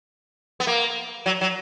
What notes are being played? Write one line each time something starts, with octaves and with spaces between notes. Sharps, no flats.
B3
A#3
F#3
F#3